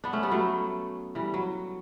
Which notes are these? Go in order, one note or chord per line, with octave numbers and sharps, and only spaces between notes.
B3 D4
A3 C#4
G3 B3
F#3 A3
E3 G3
F#3